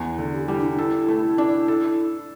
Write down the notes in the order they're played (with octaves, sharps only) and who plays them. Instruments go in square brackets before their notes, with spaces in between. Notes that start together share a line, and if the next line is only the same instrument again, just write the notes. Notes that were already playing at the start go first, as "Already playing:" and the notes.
Already playing: [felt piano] E2 B3
D3
[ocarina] G4
[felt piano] G3 [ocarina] E4
[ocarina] D4
E4
[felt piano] A4
A3
D4
A4